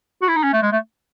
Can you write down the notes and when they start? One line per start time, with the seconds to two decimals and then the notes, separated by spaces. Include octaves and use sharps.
0.22 F#4
0.28 E4
0.36 D#4
0.43 C#4
0.53 A3
0.63 G#3
0.72 A3